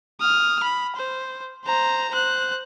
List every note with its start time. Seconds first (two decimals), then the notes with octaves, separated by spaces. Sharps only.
0.20 D#6 F6
0.63 B5
0.95 C5
1.65 C5 A#5
2.11 C5 F#6